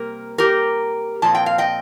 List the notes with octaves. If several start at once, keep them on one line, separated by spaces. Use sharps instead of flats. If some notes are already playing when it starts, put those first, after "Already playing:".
Already playing: C3 G3 A#3 A#4
G4 A#4
A#2 F3 C4 A5
G5
F5
D#5 G5